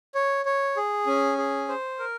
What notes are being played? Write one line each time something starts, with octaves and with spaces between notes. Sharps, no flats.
C#5
C#5
G#4
C#4
G#4
C5
A#4